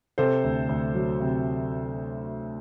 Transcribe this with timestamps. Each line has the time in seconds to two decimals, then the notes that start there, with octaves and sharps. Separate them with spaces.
0.18 C3 A4 C5
0.44 D2
0.69 D2
0.95 F#3
1.20 C3